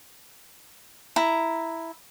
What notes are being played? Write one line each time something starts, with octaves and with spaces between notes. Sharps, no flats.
E4 A#5